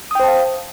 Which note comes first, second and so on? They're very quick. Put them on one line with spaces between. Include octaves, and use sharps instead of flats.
D#6 G5 C5 A5 F5